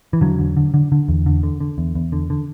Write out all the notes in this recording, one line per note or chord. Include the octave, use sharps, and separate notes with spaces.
E3
E2 D3 F#3
D3
D3
D3
D3
E2
D3
D3
D3
E2
E2
D3
D3